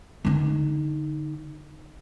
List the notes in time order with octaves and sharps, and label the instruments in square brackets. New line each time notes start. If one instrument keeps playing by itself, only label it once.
[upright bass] D3 D#4